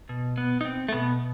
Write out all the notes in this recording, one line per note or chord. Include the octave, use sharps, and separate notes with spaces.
B2
B3
D#4
C4
A3
B2 B3